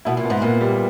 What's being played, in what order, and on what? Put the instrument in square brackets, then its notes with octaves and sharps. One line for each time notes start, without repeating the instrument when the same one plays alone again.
[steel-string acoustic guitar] B2 [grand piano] E4
[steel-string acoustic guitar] A#2
[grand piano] B3
[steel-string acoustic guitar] G#2
[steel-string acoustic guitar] A#2 [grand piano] B3
[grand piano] G3